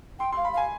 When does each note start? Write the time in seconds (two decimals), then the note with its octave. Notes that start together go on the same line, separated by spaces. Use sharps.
0.19 G5 C6
0.32 C6
0.37 F5
0.45 B5
0.53 F5 G#5